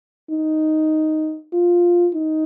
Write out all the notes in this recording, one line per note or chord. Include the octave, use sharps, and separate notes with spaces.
D#4
F4
D#4